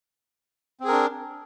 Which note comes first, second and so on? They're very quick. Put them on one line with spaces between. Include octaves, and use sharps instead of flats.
C4 G#4 A#4 D4